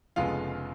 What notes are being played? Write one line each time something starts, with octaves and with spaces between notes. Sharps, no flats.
F1 F2 C#3 G#3 B3 F4 F5